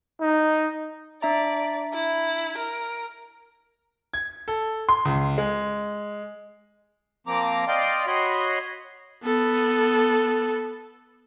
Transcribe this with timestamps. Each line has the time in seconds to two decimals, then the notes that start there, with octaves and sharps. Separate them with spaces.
0.21 D#4
1.22 D4 D5 E5 A#5
1.93 E4
2.58 A#4
4.14 G#6
4.48 A4
4.89 C6
5.05 C#2
5.38 G#3
7.27 F3 A#3 C4 A#5 D6
7.68 D5 D#5 F5 G5 C6
8.07 F#4 C#5 D#5 B5 C6
9.24 B3 A4